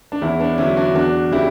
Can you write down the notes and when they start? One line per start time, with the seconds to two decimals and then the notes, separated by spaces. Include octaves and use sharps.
0.12 D4
0.22 E2 C#4 E4
0.40 B3 D4
0.58 D3 F#3 C#4 E4
0.77 D4 F#4
0.95 E2 D4 F#4
1.31 C#3 E3 E4 G4